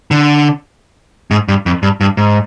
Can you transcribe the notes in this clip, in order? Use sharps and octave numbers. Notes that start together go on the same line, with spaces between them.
D3
G#2
G2
F2
G2
G2
G#2